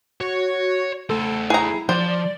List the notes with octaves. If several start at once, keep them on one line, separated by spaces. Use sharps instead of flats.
F#4 C#5
A3 A4 C5
E4 G#4 A#5
F3 C5 D5